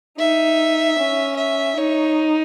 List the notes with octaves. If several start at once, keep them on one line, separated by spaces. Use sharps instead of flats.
D#4 E5
C#4
E5
D#4 C#5